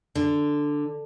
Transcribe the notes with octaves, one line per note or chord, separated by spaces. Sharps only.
D3